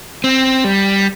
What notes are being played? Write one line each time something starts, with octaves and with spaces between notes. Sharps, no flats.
C4
G3